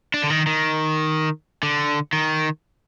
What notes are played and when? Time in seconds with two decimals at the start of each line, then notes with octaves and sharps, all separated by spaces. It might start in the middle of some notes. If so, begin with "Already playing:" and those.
0.14 D4
0.23 D3
0.30 D#3
0.47 D#3
1.63 D3
2.13 D#3